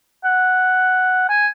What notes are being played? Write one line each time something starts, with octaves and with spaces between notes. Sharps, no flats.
F#5
G#5